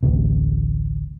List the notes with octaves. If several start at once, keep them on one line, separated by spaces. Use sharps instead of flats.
D1 A1 D2 C3